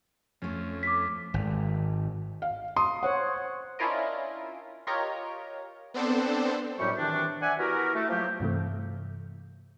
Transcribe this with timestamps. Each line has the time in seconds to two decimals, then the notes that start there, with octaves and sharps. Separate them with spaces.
0.42 F2 A3 C#4
0.83 D6 B6
1.34 G#1
2.42 F5
2.76 C6 D#6
3.03 C5 C#5 F#5
3.79 C#4 D4 E4 F4 A#4 D#5
4.87 F4 G4 A#4 C#5 D#5 A#5
5.94 B3 C4 D4 A4 C5
6.79 F#2 A2 F#3 G3 G4 C#6
6.98 C3 D#3 E3 D4
7.42 D5 E5 F#5 G#5
7.58 B3 E4 F#4 G4 A#4
7.95 A3
8.10 F3 F#3 A3 A#3 G4
8.40 G2 C3 E3 A3